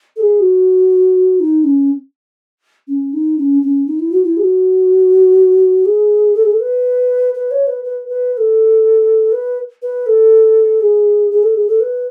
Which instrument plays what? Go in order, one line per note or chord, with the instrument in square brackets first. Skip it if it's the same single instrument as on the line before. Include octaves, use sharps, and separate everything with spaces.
[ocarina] A4
G#4
F#4
D#4
C#4
C#4
D#4
C#4
C#4
D#4
E4
F#4
E4
G#4
F#4
G#4
A4
G#4
A4
B4
B4
C#5
B4
B4
B4
B4
A4
B4
B4
A4
G#4
G#4
A4
G#4
A4
B4